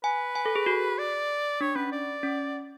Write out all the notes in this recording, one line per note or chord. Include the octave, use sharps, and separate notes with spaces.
B4 G#5
G#5
A4
G#4
F#4
D5
D4 C#5
C#4 B4
D5
C#4